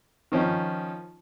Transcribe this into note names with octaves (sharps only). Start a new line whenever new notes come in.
D#3 F3 C#4 D#4